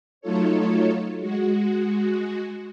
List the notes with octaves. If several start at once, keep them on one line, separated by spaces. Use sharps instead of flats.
F#3 A3 D#4 F4 A4 C#5
G#3 F#4